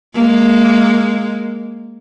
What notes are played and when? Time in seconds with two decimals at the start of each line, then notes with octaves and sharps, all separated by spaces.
0.14 G#3 A#3